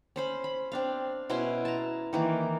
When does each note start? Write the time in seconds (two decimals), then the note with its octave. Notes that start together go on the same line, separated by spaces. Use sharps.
0.16 C#4 C5 B5
0.44 B5
0.72 C4 D4 F5
1.30 B2 C#4 E4 C6
1.65 A5 A#5
2.13 D#3 E3 A#3